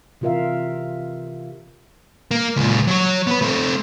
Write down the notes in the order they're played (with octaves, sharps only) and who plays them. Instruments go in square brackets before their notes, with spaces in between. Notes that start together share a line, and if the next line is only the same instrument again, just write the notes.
[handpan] C3 E3 F4 A#4 E5 F5
[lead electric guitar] A#3
C#2 A#2
F#3 C#5
B3 B4
A3 C4